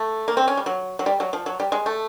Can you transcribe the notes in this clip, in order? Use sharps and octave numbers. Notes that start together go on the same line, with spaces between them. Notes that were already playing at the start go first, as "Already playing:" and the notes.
Already playing: A3
A#3
C4
C#4
G3
F#3
F#3
G3
F#3
F3
F#3
G3
G#3
A3